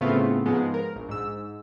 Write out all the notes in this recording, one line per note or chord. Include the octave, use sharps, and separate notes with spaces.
A2 C#3 A3 B3 C4 F4
G#2 F3 G#3 B3
A#4
A#1
G#2 E6